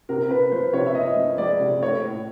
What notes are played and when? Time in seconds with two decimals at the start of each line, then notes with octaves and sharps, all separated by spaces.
0.09 C3 A#4
0.30 C3 B4
0.52 F3 C5
0.73 C3 C#5
0.87 E5
0.95 C#4 D#5
1.16 F3
1.38 G#3 D5
1.60 C3
1.82 A3 C#5
2.03 A2